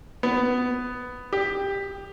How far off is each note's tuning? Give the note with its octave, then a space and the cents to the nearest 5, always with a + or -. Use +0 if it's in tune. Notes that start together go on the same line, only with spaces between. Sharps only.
B3 +10
G4 +15